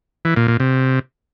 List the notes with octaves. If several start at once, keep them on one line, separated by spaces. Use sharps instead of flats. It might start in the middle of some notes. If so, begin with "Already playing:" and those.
E3
A#2
A#2
C3